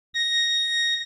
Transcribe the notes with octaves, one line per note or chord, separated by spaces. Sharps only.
A#6